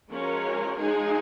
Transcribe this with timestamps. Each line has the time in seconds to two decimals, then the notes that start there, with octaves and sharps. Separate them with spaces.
0.10 F3 G#3 C#4 F#4 A#4 C#5
0.79 F3 G#3 D#4 G#4